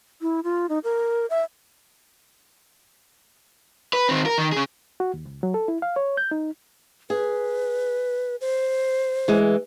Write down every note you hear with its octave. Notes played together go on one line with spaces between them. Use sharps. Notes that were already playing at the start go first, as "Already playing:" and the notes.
E4
F4
D#4
A#4
E5
B4
D#3 C4
A#4
D#3
C#3 G#4
F#4
D#2
C#2
F#3
A4
E4
F5
C#5
G6
D#4
G#4 B4
C5
E3 G#3